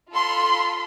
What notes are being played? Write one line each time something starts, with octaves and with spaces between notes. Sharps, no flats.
F4 A4 B5 C6